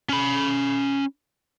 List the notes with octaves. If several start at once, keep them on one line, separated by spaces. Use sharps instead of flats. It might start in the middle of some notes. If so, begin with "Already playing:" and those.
C#4 B5